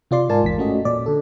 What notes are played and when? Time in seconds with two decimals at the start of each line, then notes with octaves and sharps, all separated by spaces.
0.11 C3 F4 D5 C6
0.29 G#2 F4 A#4 D5 G#5 A5
0.43 A1 E2 G#2 B6
0.58 A3 C#4 F#4 D#5
0.85 A#2 D5
1.06 D3 A4